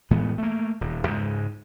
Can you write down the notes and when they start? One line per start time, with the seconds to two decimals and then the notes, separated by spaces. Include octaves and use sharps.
0.11 A2 E3 G#3 B3
0.38 A3 A#3
0.81 D#1
1.07 C#2 G#2 G3 G#3